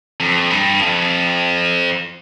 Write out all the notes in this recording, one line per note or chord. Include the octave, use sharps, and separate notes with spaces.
F2
G2
F2